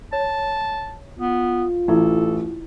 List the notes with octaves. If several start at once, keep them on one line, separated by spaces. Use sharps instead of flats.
C#5 A5
B3 F4
A1 D#4 E4 A4